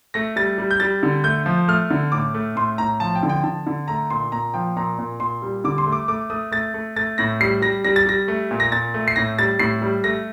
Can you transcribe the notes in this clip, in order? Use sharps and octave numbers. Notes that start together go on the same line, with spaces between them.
A3 A#6
G3 A6
G3
G6
G3 A6
D3
A3 G6
F3
A3 F6
D3
A2 D6
A3
A2 C6
A2 A#5
F3 A5
G5
D3
G5
D3 A5
D3
A3 A#5
A#2 C6
A#2 A#5
F3 G5
A#2 A#5
A#2
A#2 C6
G3
D3 D6
C6
A3
D6
A3 D6
A3 D#6
A3 A6
A3
A3 A6
A2 A#6
G3 C7
G3 A#6
G3 A#6
A6
G3 A#6
A3
A#2
A#6
A#2 A6
A3
C7
A2 A#6
G3 A6
A2 C7
G3
A3 A#6